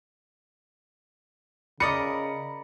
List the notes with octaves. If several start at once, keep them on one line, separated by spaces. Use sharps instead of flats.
C#3 A#4 D5 D#5 B5 C#7